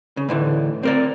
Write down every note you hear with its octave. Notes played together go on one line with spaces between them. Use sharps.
C#3
A2 D3 E3
C4 A#4 D5